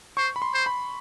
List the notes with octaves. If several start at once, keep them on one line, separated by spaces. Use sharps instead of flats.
C5 C#6
B5
C6
C5
B5